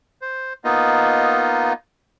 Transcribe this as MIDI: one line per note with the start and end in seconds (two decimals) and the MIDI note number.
0.22 0.53 72
0.64 1.73 58
0.64 1.73 59
0.64 1.73 63
0.64 1.73 65
0.64 1.73 75